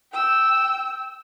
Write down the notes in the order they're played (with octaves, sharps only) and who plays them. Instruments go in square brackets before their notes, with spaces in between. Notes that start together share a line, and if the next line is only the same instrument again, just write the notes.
[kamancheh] G5 E6